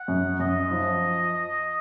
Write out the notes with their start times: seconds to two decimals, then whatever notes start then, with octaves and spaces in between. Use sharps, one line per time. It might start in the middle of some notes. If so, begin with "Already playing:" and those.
Already playing: F#5
0.08 F#2
0.39 F#2 D#5
0.71 F3